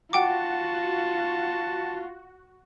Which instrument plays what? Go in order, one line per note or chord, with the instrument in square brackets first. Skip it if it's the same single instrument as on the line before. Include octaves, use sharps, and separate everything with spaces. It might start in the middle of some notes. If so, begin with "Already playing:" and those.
[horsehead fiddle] F4 [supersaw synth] F#4 [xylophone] F#5 G5 D6 [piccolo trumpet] A5